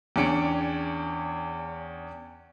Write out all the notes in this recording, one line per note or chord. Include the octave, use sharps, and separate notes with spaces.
E2 C#4 D4 G5 C#7 D7